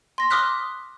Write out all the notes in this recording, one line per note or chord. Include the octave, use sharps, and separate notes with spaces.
C6 A#6
C6 D6 D#6 F6 F#6 B6